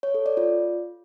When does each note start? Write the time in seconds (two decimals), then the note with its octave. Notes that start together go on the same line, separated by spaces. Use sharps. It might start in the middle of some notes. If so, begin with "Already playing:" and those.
0.03 C#5
0.14 A4
0.26 D5
0.37 F4